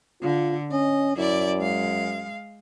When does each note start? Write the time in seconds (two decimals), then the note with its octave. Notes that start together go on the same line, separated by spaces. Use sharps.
0.23 D3 F4
0.71 C#4 D#5
1.17 F#2 E4 D5
1.58 G#3 F5